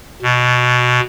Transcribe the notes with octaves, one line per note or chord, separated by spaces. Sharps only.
B2